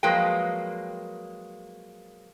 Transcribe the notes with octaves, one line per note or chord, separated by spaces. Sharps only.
F3 F#3 G#3 A#3 B4 G5